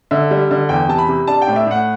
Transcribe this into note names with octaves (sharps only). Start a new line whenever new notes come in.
D3 E5
G3
D3
E2 G5
C3 A5
B5
C3
D4 A5
G5
A2 D5
E5
A2 F#5